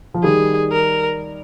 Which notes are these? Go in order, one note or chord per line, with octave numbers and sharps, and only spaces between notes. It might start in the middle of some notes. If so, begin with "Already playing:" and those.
F3
D#3 G3 G#4
A#4